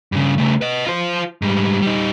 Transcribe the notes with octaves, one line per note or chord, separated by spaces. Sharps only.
G2 C#3
C#3 A3
B4 D#5
F4 C5
G#2 G3
G3 D#4